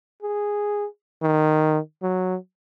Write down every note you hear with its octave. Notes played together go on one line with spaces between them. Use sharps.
G#4
D#3
F#3